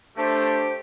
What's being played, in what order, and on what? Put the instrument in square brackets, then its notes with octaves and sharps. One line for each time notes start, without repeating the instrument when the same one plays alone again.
[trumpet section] A3 [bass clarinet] D4 [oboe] G4 [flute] C5